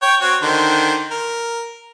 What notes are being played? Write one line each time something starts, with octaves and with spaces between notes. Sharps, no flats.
C#5 G5
C4 F#4 C#5
D3 D#3 C5
A#4